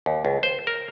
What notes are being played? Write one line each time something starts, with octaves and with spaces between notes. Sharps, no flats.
D#2
C#2
C5
A#4